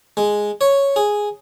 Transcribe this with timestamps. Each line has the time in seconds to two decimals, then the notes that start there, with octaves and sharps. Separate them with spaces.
0.17 G#3
0.61 C#5
0.96 G#4